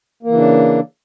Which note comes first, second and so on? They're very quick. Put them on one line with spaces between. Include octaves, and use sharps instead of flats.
A#3 E3 C#3 D4